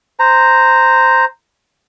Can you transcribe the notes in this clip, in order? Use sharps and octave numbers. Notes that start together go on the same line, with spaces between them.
C5 A#5